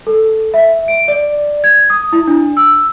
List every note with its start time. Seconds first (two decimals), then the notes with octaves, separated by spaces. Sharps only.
0.07 A4
0.54 E5
0.88 D7
1.08 D5
1.64 G#6
1.90 D#6
2.13 E4
2.27 D4
2.57 E6